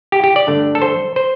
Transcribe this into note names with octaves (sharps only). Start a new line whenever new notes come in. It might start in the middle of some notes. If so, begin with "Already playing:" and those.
G4
G4
D5
G2 D3 A3 D4
A4
C5
C5